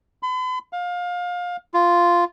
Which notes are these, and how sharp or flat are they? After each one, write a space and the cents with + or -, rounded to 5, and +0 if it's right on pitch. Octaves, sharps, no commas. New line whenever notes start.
B5 +45
F5 +25
F4 -5